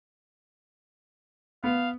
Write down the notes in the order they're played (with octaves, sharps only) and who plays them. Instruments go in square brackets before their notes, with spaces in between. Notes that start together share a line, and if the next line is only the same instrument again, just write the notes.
[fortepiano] B3 [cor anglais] F5